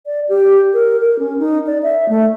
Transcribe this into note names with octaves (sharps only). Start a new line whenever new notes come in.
D5
G4
A#4
A#4
C#4
D#4
D5
E5
A3